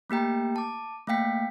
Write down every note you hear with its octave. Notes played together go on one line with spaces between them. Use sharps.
A3 A#3 G4 G5 A#5
A5 D6
A3 A#3 F5 G5 B6